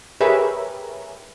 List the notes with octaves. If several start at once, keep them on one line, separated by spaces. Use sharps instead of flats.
G4 G#4 A#4 B4 C#5 E5